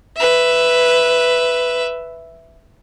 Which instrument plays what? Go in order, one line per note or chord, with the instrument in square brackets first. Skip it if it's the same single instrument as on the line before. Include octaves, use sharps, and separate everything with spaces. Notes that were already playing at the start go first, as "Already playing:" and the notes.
[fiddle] B4 E5